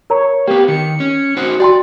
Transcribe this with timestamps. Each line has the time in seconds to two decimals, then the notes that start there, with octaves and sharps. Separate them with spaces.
0.10 A#4 C#5 A#5
0.47 A#3 B3 G4
0.68 D#3 C#7
1.00 C#4
1.37 D#4 F#4 C5
1.60 F#4 D5 G5 C6